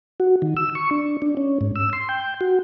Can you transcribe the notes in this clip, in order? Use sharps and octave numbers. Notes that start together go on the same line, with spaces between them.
F#4
D#3
E6
C#6
D4
D4
C#4
G#2
E6
C6
G5
F#4